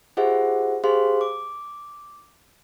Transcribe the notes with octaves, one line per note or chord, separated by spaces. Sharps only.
F4 G4 G#4 C5 E5 F#5
G4 G#4 C5 F5 C6
D6